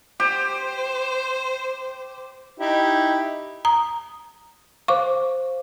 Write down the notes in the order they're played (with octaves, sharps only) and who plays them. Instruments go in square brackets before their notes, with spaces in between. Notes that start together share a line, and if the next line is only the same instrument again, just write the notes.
[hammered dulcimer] G4 [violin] C5
[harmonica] D#4 E4 G4
[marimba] A#5 D#6
[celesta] C5 F5 [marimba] C#6 D6